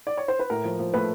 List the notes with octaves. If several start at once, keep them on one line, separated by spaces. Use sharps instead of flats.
D5
C#5
C5
B4
A2 A#4
F3
F3
A3 B4